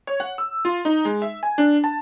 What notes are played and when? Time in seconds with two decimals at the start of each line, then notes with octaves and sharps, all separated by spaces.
0.07 C#5
0.20 F#5
0.38 E6
0.65 F4
0.85 D#4
1.05 G#3
1.22 E5
1.43 G#5
1.58 D4
1.84 A5